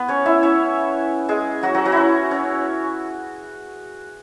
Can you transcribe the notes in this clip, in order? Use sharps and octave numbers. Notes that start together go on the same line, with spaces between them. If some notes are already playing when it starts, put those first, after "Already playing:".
Already playing: B3 B4
C#4 C#5
E4 E5
C#4 C#5
G#3 G#4
F#3 F#4
F#3 F#4
F#3 F#4
C#4 E4
C#4